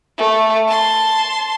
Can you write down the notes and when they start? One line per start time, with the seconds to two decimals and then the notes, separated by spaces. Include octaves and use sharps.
0.18 A3
0.68 A5 C6